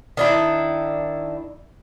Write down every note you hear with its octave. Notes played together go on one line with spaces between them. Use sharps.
D#3 D4 E4